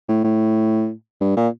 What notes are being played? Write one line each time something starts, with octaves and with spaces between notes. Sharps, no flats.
A2
A2
G2
A#2